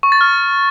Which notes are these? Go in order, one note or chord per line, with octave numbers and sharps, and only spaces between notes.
C#6
A6
F6